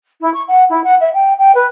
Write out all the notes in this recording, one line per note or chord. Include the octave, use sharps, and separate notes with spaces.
E4
C#6
F#5
E4
F#5
E5
G5
G5
B4